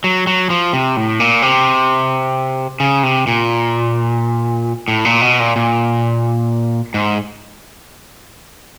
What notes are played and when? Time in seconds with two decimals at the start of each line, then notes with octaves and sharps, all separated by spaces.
0.04 F#3
0.27 F#3
0.50 F3
0.73 C3
0.97 A2
1.20 A#2
1.42 C3
2.80 C#3
3.03 C3
3.27 A#2
4.88 A2
5.05 A#2
5.22 B2
5.40 A#2
5.56 A#2
6.94 G#2